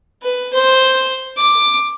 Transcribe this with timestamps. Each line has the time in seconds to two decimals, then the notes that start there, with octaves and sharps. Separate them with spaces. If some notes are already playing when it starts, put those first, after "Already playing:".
0.23 B4
0.54 C5
1.37 D6